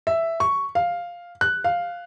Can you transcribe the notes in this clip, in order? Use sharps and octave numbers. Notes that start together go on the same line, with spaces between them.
E5
C#6
F5
F#6
F5